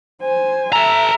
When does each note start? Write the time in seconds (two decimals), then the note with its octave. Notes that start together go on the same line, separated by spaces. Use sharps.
0.22 C5 G#5
0.73 A4 E5 A#5